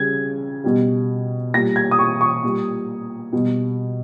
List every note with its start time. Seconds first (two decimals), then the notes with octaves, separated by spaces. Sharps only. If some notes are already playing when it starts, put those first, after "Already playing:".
Already playing: C#3 G3 G#6
0.64 B2 G3
1.54 A#2 G3 A#6
1.76 G#6
1.91 D#6
1.99 C#6
2.21 C#6
2.44 A#2 G3
3.33 B2 G3